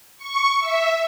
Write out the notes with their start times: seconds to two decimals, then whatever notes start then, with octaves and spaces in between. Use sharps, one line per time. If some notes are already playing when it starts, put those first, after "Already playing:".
0.18 C#6
0.59 E5